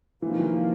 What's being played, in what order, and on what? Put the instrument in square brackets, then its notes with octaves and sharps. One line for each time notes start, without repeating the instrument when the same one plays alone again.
[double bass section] C3 F3 A#3 [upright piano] E3
[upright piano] D#3
E3